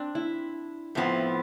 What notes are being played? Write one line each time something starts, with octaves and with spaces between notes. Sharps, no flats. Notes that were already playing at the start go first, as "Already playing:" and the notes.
Already playing: C4 D4
E4
A2 F3 B3 C4